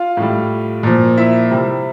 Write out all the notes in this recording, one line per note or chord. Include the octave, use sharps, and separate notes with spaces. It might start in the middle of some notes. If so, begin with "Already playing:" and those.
Already playing: F4 F5
A2 G3
A#2 F3
E4 E5
C3 G3